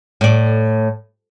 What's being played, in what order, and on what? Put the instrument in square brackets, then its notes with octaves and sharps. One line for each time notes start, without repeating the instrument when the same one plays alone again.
[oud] A2 D5